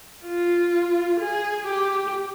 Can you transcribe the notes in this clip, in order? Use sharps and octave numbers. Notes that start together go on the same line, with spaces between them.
F4
G#4
G4